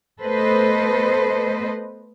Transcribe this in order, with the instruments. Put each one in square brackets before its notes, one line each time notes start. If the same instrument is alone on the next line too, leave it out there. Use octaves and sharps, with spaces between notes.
[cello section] A3 B3 A4 B4 C5 D#5